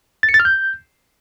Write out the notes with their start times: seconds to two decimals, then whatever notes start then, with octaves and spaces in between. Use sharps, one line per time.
0.23 A6
0.29 C#7
0.34 A6
0.40 F6
0.45 G6